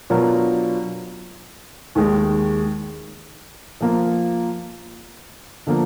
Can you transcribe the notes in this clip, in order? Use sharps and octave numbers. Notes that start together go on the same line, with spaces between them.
B2 F#3 D4 F4 A#4
D#2 D#3 G#3
F3 A#3 F4
D3 F3 A#3